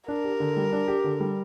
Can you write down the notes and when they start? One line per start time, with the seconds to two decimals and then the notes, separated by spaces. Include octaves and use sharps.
0.08 D4 A#4
0.24 G4
0.40 D3
0.57 G3
0.73 D4
0.88 G4
1.04 D3
1.20 G3